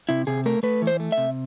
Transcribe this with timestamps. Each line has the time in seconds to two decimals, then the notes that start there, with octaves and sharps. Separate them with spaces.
0.09 C3 E4
0.27 C3 G#4
0.46 A3 A#4
0.63 A3 B4
0.82 E3
0.87 C5
1.00 A3
1.12 E5
1.18 C3